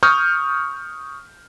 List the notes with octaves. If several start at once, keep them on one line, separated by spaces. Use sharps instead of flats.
C#6 D#6 F6 G6